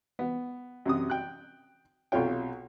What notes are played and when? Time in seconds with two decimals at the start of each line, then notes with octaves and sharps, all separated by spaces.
0.19 B3
0.86 F#2 C3 D#6
1.10 G5 F#6
2.12 B1 C3 F4 C#5 G5